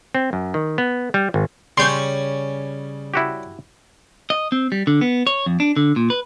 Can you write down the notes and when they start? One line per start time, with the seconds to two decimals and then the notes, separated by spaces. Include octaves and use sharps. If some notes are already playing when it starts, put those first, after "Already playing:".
0.15 C4
0.33 F#2
0.54 D#3
0.78 B3
1.14 G3
1.34 G#1
1.77 C#3 G3 C#4 C6 G6
3.14 E4 F#4 G4
4.30 D#5
4.52 C4
4.72 G3
4.87 D3
5.01 B3
5.27 C#5
5.46 F2
5.60 D4
5.76 D3
5.96 A#2
6.10 B4